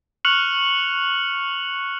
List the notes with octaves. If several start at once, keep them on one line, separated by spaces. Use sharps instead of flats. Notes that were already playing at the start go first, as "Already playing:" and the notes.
C#6 F6 F#6 C#7 F7 F#7